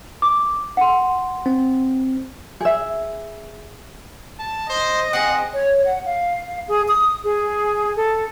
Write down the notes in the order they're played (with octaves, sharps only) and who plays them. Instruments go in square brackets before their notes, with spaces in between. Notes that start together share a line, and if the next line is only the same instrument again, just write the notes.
[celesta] D6
F#5 C6
[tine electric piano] C4
[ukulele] G#4 E5
[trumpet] A5
[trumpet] C5 [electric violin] D#5
[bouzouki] C4 G#4 [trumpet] F#5
[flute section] C#5
F#5
F5
G#4
D#6
G#4
A4